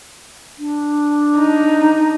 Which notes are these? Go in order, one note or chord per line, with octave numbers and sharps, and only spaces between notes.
D4
D#4